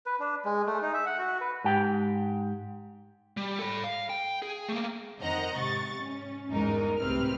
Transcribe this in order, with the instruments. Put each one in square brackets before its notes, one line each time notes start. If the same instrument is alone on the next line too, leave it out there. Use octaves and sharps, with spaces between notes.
[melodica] B4
D4
G#3
A3
D#4
E5
F#5
F#4
B4
[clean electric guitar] G#2 G4 G5
[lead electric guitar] G3
A4 B5
F5
G5
G#4
A3 A#3
[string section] F2 D#3 C5 D#5 F#5 A#5
G#2 C3 C#6 A6
C#4
G1 E2 G#2 G#3 D#4 A#4
C2 A2 C3 C4 B4 F6